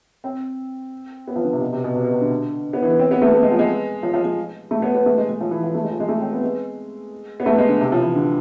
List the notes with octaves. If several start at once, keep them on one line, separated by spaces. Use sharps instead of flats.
C4
B3
F3
D3
C3
B2
C3
B2
C3
B2
C3
D3
B3
E3
B3
C4
B3
A3
A3
G#3
F3
G#3
F3
F3
G#3
A3
B3
B3
A3
G#3
G#3
F3
E3
F3
A3
G#3
F3
G#3
A3
C4
B3
G#3
B3
A3
G#3
D3
C3
F3
E3
D3